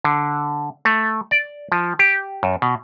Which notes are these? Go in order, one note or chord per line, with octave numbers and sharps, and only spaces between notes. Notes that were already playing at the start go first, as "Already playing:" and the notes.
D3
A3
D5
F3
G4
F#2
B2